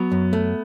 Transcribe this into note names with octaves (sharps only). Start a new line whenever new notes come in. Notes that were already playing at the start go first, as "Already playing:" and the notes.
Already playing: F#3 B3
F#2
A3